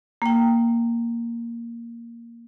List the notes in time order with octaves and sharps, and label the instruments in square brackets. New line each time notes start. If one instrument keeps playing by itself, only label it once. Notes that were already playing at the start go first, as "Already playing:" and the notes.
[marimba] A#3 G5